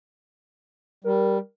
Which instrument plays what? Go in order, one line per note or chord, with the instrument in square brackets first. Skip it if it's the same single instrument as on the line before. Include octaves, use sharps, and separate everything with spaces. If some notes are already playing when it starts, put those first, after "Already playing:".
[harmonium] G3 [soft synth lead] A#4